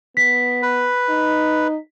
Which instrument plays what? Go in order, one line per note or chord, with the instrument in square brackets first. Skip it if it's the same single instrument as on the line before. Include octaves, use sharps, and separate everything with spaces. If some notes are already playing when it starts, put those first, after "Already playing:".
[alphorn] B3 [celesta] B6
[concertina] B4
[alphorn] D#4